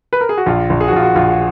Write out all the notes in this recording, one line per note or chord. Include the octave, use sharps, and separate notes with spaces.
B4
A#4
G#4
F#4
A#1 F4
A#1
G#4
F#4
A#1 F4
F#4
A#1 F4